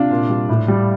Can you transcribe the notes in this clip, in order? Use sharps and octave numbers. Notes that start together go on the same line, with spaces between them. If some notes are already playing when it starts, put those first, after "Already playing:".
Already playing: C3 D4 F4
A#2
G3
A2
G3